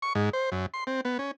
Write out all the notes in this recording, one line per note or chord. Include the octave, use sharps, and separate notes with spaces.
C#6
G#2
C5
F#2
C6
C4
B3
C#4